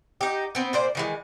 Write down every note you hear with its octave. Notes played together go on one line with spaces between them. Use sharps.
D#4 G4
B3 C4
A#2 C5 D5
D#3 E3 G#3